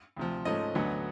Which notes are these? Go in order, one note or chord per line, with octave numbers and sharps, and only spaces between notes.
D2 C3 F3
G#2 F3 A3 C#4 D#5
D2 D3 F#3 B3